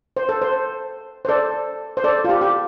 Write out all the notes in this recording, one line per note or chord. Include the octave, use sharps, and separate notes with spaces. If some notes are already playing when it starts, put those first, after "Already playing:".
C5
A4
C5
C5
A4 D5
C5
A4 D5
F4
G4
G4